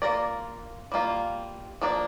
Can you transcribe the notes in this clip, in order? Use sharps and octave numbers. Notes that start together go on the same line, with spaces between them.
A#3 F4 A#4 D5
G3 A#3 F4
F3 A#3 D4